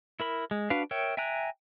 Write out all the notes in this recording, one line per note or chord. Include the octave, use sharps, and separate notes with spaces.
E4 A#4 B5
G#3
D4 F#4 B4 F5
A#4 C#5 E5 G5
E5 G5 G#5 A#5 F#6